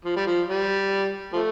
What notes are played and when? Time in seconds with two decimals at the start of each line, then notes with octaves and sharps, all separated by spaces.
0.05 F3
0.16 G3
0.27 F3
0.48 G3
1.33 F3 A3